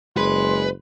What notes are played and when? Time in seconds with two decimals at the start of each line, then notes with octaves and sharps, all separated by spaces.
0.17 F#1 G#3 B4 C6